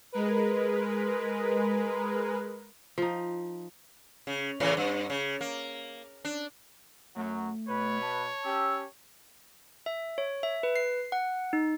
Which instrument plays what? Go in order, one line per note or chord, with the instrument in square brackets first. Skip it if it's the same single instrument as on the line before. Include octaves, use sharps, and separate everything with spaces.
[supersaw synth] G#3 A#4 B4
[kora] F3 D#4
[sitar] C#3
A2 C#3 E3
G2
C#3
A#3
D4
[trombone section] F#2 F#3 [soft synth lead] A3
[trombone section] B2 B4 [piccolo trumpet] C#5
[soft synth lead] A5
[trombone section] C#4 G4 [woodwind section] E6
[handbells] E5
C#5
E5
B4
C7
F#5
D#4